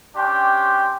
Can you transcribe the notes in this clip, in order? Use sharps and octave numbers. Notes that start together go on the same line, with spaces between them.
C#4 D4 G4 G5 C6